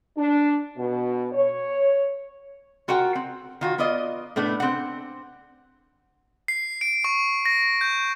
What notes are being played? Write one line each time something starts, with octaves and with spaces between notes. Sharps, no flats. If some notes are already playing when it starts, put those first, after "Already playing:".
D4
B2
C#5
F4 F#4 A#4 F#5 G5
C4
D#3 F4 F#4
B3 F4 D5 D#5
A2 A3 B3 D4
C4 F#5
C7
D7
C#6
A#6
G6